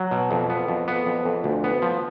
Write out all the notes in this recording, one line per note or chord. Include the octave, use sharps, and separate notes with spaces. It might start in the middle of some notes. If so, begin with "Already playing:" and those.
Already playing: F#3
B2
F2
B3
F2
B3
F2
F2
D2
B3
F3